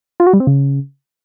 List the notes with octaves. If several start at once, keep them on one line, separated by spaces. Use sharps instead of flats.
F4
F#4
G3
C4
C#3